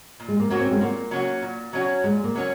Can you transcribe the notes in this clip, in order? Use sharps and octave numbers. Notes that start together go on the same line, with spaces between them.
A#2
G#3
A#3
F#3 A#3 C#4 F#4
C4
G#3
A#2 A#3
F#3 C#4 F#4
A#2
F#3 C#4 F#4
A#2 G#3
A#3
F#3 C#4 F#4